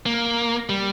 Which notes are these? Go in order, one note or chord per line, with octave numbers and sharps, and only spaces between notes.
A#3
G3